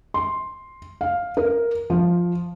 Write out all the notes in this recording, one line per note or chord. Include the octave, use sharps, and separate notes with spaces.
C6
F5
A#4
F3